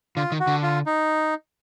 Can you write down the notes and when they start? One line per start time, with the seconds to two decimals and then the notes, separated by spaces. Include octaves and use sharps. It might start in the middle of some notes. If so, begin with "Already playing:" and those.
0.16 D3 F4
0.32 D#3
0.40 F#4
0.47 D3
0.63 F4
0.86 D#4